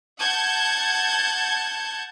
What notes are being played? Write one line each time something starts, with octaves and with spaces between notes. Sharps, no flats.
F#5 A5 G6 G#6